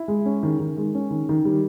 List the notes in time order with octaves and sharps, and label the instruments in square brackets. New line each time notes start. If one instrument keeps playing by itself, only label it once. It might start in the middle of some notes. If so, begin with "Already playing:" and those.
Already playing: [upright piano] E4
G#3
C#4
D#3
D#3
G#3
C#4
D#3
D#3
G3